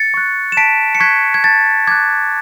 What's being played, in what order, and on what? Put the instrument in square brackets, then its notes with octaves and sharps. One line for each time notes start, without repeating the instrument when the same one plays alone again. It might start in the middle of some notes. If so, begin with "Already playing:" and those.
Already playing: [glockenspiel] A6 C#7
C#6 F#6
E7
A5 B6 D7
C#7
C#6 F#6 G#6 B6
G#6
A5 A6
D6 F#6 G#6